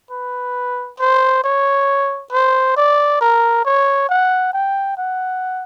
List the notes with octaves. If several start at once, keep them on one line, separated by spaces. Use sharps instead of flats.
B4
C5
C#5
C5
D5
A#4
C#5
F#5
G5
F#5